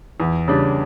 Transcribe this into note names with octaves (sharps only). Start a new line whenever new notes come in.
E2
C#3 G3 D4